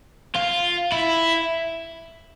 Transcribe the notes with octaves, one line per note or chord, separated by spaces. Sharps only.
F4
E4